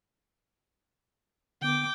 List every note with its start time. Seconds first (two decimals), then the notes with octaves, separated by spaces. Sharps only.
1.62 D3 B3 G5 D6